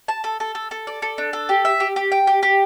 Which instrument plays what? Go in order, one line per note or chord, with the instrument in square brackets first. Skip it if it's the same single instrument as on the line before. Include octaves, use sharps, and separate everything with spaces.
[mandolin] A5
A4
A4
A4
A4
D5
A4
D4
A4
G4
E5
G4
G4
G5
G4
G4